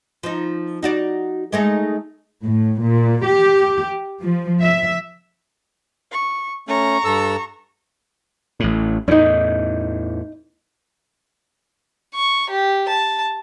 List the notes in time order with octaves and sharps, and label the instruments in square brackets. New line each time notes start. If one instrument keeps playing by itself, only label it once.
[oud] F3 D#4
D#4 F#4 D5
G#3 A3 D#4
[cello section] A2
A#2
G4
F3
E5
[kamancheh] C#6
[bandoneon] A3 C#4 [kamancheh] A#5 C#6
[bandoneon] G2 A4 E6
[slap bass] A1 A2
[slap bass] E2 A2 [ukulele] C#4 D#4
[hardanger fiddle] C#6
G4
A5